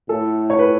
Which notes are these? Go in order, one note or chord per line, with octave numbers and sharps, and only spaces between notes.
A2 A4
C#5
B4